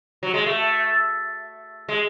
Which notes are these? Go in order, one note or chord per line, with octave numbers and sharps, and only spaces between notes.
F#3
G#3
A3
G#3